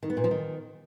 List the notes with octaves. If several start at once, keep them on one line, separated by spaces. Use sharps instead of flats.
D#3
B3
A#2
F3
D#3